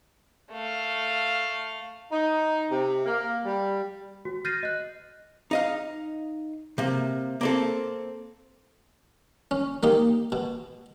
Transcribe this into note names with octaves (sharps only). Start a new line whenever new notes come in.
A3 F5
D#4
C3
A#3
G3
F#4
F6 G6 A6 A#6 C7 D#7
D#5 F#6
D#4 D#5 F5
C3 A#3
A#3 C4 A4
C#4
A#3 D#4 G4
B2